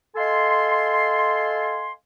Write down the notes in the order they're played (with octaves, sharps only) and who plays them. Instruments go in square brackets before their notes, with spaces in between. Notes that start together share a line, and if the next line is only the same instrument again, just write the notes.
[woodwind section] A4 D#5 F5 G#5 C6